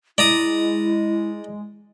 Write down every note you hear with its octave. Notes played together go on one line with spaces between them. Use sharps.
G#3 E4 D5 A#5 D#6